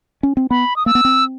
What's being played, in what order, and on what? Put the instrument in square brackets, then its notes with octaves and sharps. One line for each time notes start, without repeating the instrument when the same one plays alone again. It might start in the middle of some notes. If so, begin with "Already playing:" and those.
[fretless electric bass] C#4
C4
[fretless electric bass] B3 [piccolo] B5
[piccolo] D#6
[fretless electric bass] A#3 [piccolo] E6
[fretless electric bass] B3
C4